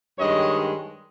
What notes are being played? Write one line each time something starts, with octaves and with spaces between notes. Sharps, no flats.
G2 D#3 G#3 C#5 D#5